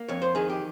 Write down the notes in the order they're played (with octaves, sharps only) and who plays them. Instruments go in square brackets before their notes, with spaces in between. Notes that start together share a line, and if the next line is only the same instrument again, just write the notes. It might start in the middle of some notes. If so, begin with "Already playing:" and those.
Already playing: [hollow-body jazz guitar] A#3
F2 C#5
C5
D#3 G#4
G4